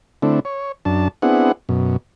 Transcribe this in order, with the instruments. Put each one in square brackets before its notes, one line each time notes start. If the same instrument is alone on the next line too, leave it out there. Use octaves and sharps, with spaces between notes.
[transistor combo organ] D3 A3 C4 D4 E4
C#5
F#2 D4 A5
B3 C4 D4 E4 G#4 F#5
F#2 B2